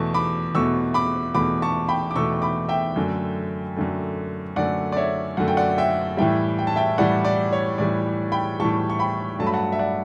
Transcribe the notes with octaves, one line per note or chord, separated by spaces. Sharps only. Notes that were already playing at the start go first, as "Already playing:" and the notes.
Already playing: E2 B2 A3 A5 C#6
B5 D6
E2 B2 A3 C#6 E6
B5 D6
E2 B2 A3 B5 D6
A5 C#6
G5 B5
D6
E2 B2 A3 C#6 E6
B5 D6
E5 G5
F#2 D3 A3
F#2 D3 A3
F#2 D3 A3 D5 F#5
D5
C#5 E5
F#2 D3 A3 F#5
G5
D5 F#5
E5 G5
A2 E3 G3 E5 G5
G5
A5
E5 G5
A2 E3 G3 D5 F#5
D5
C#5
A2 E3 G3 D5
G5 B5
A2 E3 G3 A5 C#6
C#6
G5 B5
G2 F#3 A3 A5
B5
F#5 A5
E5
D5 F#5